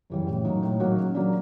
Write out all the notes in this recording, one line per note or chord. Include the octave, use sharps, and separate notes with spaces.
F#2 C#3 E3 G3
A2
F#3 A#3 D#4 F#4
A2
F#3 A#3 D#4 F#4
C#3
F#3 A#3 D4